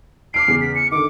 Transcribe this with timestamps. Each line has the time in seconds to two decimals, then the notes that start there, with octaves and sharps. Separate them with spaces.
0.34 D6 F6 C7 D7
0.48 E2 C#3 G#4
0.61 B6
0.75 C#7
0.92 D3 D#3 D6